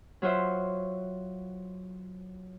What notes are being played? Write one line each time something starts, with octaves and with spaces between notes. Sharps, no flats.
F#3 F4 F#4 C5 E5